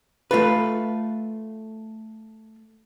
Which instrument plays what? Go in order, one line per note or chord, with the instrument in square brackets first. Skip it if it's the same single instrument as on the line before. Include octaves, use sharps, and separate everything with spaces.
[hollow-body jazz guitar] A3 F4 A4 B4